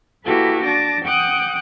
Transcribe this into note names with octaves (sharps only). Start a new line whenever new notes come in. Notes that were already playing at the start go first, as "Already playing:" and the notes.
A#3 E4 F#4 G4 A4 B4
D4 A5 D6 A#6
F#5 G5 D6 D#6 F#6 G6